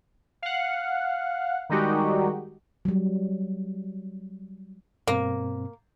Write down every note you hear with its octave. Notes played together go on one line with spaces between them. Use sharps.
F5 F#5
D#3 G3 G#3 D#4 F#4 G4
F#3 G3
G2 B2 A#3 C4